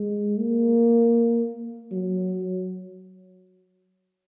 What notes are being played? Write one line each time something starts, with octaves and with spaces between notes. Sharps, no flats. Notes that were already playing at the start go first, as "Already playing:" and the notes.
Already playing: G#3
A#3
F#3